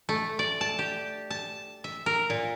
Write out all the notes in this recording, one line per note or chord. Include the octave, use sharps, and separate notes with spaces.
A3
D5
A5
G4
A5
E5
A#4
A#2